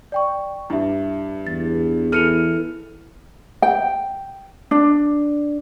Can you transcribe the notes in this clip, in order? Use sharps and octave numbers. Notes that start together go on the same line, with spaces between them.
D5 G5 C#6
G2 E4 E5
E2 A6
E3 A4 F6 C#7 D#7 F7
G5
D4